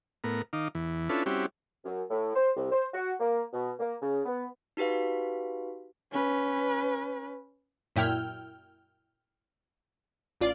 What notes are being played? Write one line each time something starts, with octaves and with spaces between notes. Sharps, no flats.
A2 B3 A#4
D#3 D#4 F5 D6
E2 E3
C#4 D4 E4 F4 A4 B4
G3 C4 C#4 E4 F#4 G4
F#2
A2
C5
C2
C5
F#4
A#3
B2
A#3
C#3
B3
D#4 F#4 G4 B4 F5
C#4 B4
F#2 A#2 E4 G5 F6
A1 F4 D5